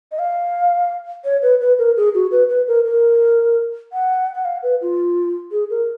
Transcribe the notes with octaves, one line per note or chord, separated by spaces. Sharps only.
D#5
F5
C#5
B4
B4
A#4
G#4
F#4
B4
B4
A#4
A#4
F#5
F#5
F5
B4
F4
G#4
A#4